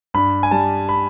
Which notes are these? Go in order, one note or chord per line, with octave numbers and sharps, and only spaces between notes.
G2 B5
G#5
G3 A5
B5